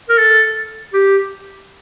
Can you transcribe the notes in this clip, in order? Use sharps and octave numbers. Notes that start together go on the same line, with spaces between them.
A#4
A4
G4